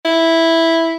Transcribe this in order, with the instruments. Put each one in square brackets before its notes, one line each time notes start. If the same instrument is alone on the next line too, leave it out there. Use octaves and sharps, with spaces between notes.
[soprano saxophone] E4